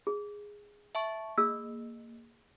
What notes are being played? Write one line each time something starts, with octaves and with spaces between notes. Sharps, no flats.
G#4
E5 A5 C#6
A#3 G#4 E6